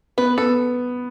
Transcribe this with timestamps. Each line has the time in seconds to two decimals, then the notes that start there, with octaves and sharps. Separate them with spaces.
0.18 B3 B4
0.38 B3 A4